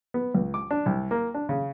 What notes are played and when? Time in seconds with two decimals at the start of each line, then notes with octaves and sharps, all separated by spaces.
0.14 B3
0.35 C#2
0.54 D6
0.71 D4
0.86 C2
1.11 A#3
1.34 D4
1.49 C#3